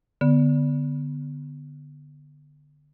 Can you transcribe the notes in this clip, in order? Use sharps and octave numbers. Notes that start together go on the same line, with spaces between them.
D3 B3